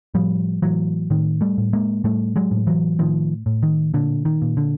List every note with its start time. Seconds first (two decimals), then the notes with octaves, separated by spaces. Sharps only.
0.14 A2 F3 G3
0.62 A2 E3 F#3
1.10 A2 D#3
1.41 G3 A3
1.58 A2
1.73 G#3 A#3
2.04 A2 G3 A3
2.36 F#3 G#3
2.51 A2
2.67 E3 F#3
2.99 A2 D#3 F3
3.46 A2
3.63 D#3
3.94 A#2 D3
4.25 D#3
4.42 A#2
4.57 D3